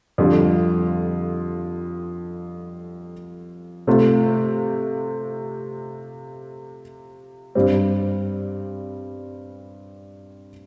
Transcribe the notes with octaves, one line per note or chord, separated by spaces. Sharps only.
F2 D3 G3 F4
C3 A3 F4
G2 G3 C4